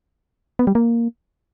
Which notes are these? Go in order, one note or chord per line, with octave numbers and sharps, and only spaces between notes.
B3
G3
A#3